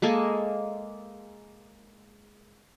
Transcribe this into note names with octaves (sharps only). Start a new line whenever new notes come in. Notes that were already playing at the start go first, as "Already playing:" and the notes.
G#3 A#3 A4 G#5